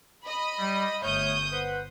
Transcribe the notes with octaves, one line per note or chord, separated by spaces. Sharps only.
D#5 B5
G3
G1 A3 C#5 D#6 F6 G6
B4 C5 F#5